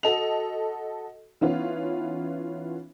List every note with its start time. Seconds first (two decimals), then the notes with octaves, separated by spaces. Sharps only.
0.03 F#4 A4 D#5 F7
1.41 E3 B3 C#4 D#4 F4